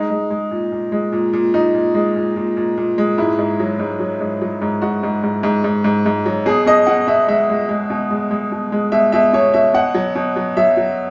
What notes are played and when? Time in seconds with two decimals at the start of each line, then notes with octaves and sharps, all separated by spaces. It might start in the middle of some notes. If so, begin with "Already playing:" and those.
Already playing: G#3 D#4
0.10 G#3
0.30 G#3
0.51 A#2
0.72 A#2
0.92 G#3
1.12 A#2
1.33 A#2
1.54 A#2 D#4
1.75 A#2
1.95 G#3
2.16 A#2
2.36 A#2
2.57 A#2
2.78 A#2
2.98 G#3
3.18 G#2 E4
3.39 G#2
3.60 F#3
3.79 G#2
4.00 F#3
4.21 G#2
4.42 F#3
4.62 G#2
4.82 G#2 F#4
5.03 G#2
5.23 G#2
5.43 G#2
5.64 G#2
5.84 G#2
6.06 G#2
6.26 F#3
6.46 B2 G#4
6.66 B2 D#5
6.87 B2 F#5
7.08 B2 E5
7.28 G#3 E5
7.49 G#3
7.69 G#3
7.90 B2
8.11 G#3
8.31 G#3
8.52 B2
8.72 G#3
8.92 B2 E5
9.12 B2 E5
9.33 B2 C#5
9.54 B2 E5
9.74 B2 F#5
9.94 F#3
10.16 B2
10.36 F#3
10.57 F#3 E5
10.77 F#3